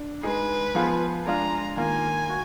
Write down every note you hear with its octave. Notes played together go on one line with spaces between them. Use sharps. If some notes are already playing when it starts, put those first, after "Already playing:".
Already playing: D4
G#3 D#4 G#4 B4
F3 B3 F4 G#4
G#3 D4 F4 G#4 A#5
D#3 A#3 F4 G#5
F#4